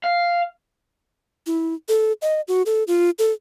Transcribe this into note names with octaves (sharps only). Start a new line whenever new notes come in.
F5
E4
A4
D#5
F#4
A4
F4
A4